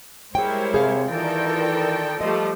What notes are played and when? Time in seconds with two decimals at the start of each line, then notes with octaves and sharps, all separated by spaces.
0.35 G3 G#3 E4 G#4 A#4 C5 C#5 G5
0.74 C3 G#4 F5
1.10 D#3 E3 F4 A4 A#4 D5 G5
2.21 F3 G3 A3 D#5